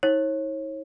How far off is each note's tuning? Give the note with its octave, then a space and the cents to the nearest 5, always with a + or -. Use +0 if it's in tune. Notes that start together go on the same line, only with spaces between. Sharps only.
D#4 +45 C#5 -30